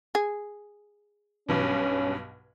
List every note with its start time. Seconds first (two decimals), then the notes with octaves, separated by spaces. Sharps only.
0.15 G#4
1.49 B1 G2 B2 C#4